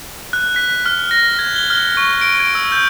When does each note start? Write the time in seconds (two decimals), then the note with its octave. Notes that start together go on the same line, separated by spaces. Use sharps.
0.33 F#6
0.56 B6
0.86 F6
1.11 A#6
1.39 G#6
1.56 G7
1.70 F6
1.97 C#6
2.21 D7
2.40 G#6
2.55 E6
2.72 G6